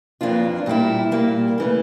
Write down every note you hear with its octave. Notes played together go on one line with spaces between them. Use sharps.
F2 E3 A#3 D4 F4
A#2 G3 A#3 E4
A#2 G3 A#3 E4
C#3 E3 A3